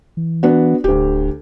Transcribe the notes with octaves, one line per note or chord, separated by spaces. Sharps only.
E3
B3 D4 F#4
D1 D2 G4